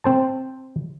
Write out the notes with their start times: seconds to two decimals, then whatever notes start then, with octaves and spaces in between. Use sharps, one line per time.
0.04 C4 C5 A5